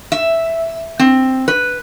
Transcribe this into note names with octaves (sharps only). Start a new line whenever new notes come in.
E5
C4
B4